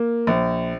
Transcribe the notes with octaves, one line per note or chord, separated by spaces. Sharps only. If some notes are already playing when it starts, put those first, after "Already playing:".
Already playing: A#3
A#1